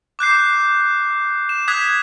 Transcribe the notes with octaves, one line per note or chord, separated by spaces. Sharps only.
D6 F#6 G6 C7
E7
D#6 F#6 G#6 B6 E7